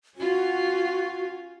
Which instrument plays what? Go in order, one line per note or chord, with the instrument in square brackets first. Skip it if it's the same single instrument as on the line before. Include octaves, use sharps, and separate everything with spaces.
[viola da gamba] C#4 F4 [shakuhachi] F#4